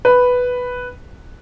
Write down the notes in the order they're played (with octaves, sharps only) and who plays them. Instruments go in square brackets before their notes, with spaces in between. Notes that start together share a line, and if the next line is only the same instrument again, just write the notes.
[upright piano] B4